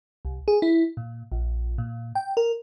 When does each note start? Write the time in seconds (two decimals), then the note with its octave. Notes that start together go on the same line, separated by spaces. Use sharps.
0.25 C2
0.48 G#4
0.62 E4
0.97 A#2
1.32 A#1
1.78 A#2
2.15 G5
2.37 A#4